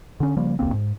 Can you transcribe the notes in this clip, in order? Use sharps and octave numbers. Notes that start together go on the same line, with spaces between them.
D3 C#4
C#3 F3 G3 A#3
E1 C#2 A#3 C4
G#2